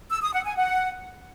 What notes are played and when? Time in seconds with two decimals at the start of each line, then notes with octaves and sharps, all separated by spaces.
0.10 E6
0.22 D#6
0.33 F#5
0.45 G#5
0.56 F#5